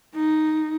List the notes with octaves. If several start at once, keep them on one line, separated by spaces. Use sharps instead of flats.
D#4